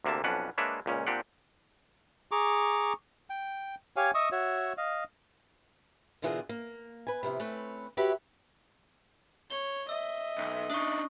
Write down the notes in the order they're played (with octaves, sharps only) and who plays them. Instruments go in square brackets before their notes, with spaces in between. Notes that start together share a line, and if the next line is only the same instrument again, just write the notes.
[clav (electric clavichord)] D2 C3 A#3 E5 A5
B1 F2 C#4 D4 B4 F#5
G#3 A#3 D4 B4 C#5 E5
C#2 A#2 C#4
A#2 C4 D4 G4 F#5
[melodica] G#4 A#5 C#6 D6
G5
G4 C#5 F5 G#5
D#5 E5 C#6 D#6
F#4 C#5 E5
D#5 F5
[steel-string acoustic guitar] B2 D3 E3 F4 G#4 A#4
A#3
B4 G#5
C3 F3 E4
A3 C4 C#4 B4
F#4 G4 B4 C#5 E5
[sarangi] C#5 [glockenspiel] G7
[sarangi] D#5 [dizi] E5 [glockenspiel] E6
[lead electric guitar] B1
[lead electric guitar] D4 D#4 [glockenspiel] C#6 D#6